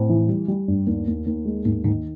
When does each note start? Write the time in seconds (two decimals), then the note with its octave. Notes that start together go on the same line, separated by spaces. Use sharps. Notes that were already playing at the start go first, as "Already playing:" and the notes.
Already playing: A2 C4
0.09 E3
0.29 G3
0.48 G3
0.68 G2
0.87 D#2
1.07 D#2
1.26 D#2
1.45 G#3
1.65 D#2 G#2
1.85 G#2 D#3